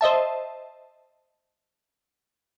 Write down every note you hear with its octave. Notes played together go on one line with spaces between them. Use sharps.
C5 D#5 E5 A5